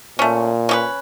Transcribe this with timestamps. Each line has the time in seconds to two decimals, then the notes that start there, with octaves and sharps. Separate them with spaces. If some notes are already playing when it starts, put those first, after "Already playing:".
0.19 A#2 A3 C#4
0.69 C#4 G4 B4